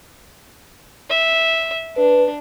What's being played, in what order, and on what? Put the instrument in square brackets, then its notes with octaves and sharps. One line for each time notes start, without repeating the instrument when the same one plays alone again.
[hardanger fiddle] E5
[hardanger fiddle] D4 [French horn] B4